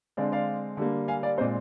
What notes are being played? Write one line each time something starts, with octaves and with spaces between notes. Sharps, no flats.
D3 G#3 C4 D5 F5
D5 F5
D3 G3 A#3
F5 G#5
D5 F5
A#2 G#3 C4 C5 D#5